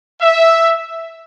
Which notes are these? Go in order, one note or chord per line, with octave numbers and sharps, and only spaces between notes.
E5